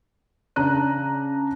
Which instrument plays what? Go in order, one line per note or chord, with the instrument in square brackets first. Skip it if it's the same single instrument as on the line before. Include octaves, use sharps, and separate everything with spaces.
[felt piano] C#3 D4 A#5 F#6 D#7